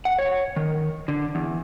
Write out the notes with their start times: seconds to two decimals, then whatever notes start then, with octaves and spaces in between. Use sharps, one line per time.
0.05 F#5
0.18 C#5
0.56 D#3
1.08 D3
1.35 E2